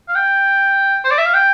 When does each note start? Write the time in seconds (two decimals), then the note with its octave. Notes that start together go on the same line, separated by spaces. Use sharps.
0.08 F5
0.15 G5
1.04 C5
1.11 D5
1.18 E5
1.26 F5
1.34 G5